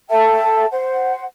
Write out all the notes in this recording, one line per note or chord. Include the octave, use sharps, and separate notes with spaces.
A4 E5 G5 A5
C5 F#5